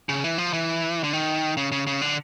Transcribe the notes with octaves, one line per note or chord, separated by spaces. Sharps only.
C#3
E3
F3
E3
D3
D#3
C#3
C#3
C#3
D3